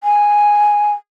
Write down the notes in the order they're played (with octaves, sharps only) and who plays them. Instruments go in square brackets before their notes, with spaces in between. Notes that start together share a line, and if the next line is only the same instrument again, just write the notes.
[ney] G#5